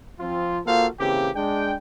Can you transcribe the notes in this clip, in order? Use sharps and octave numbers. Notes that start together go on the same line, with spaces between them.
F3 C4 F4
A#3 F4 F#4 A4 C5 F5
C#3 E3 A#3 C4 G4
G#3 D4 G5